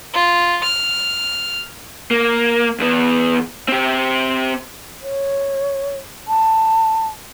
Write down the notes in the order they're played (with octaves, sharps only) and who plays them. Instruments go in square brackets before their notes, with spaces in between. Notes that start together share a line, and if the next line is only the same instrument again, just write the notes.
[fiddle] F4
F6
[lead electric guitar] A#3
E2 B3
C4 G4
[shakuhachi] C#5
A5